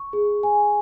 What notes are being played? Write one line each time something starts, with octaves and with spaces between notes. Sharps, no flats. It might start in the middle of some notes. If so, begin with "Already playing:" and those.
Already playing: C#6
G#4
G#5